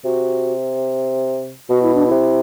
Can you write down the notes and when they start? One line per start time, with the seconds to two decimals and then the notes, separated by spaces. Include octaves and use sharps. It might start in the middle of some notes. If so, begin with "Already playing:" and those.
0.04 C3 F#4
1.69 B2 F#4
1.82 E4
1.94 D4
2.07 C3 E4